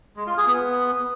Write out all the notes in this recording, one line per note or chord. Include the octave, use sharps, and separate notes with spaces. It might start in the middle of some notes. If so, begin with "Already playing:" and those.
G#3
F4
G#4
B3